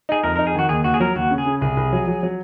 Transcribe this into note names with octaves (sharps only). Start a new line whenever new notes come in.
D#4 G#4
F2 A#4
D#4 A#4
G#4
D#3 F#4
D#2 G#4
D#2 F#4
G#4
F#3 A#4
D#2 F#4
C#3
G#4
C#3
C2 G#4
C2
F#3
F#3
F#3